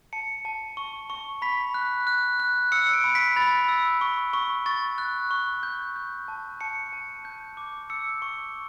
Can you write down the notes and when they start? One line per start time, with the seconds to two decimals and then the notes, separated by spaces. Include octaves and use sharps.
0.13 A5 C#7
0.45 A5
0.77 C#6
1.10 C#6
1.42 B5 B6
1.74 F#6
2.07 F#6
2.40 F#6
2.72 E6 C#7
2.93 D7
3.04 B5
3.15 B6
3.36 B5 A6
3.68 E6
4.01 C#6
4.33 C#6
4.66 C#6 A6
4.98 F#6
5.31 C#6
5.63 G6
5.96 G6
6.28 A5
6.61 A5 C#7
6.93 A5
7.25 G6
7.57 D6
7.90 E6 C#7
8.22 C#6